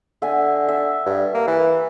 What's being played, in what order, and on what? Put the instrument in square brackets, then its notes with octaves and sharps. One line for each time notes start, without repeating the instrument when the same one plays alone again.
[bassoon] D3 [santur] E5 F#5 G#5
[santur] E5
[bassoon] G2
A#3
E3